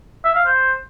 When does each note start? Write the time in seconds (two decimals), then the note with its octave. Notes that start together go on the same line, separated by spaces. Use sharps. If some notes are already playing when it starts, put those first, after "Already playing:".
0.25 E5
0.35 F5
0.46 C5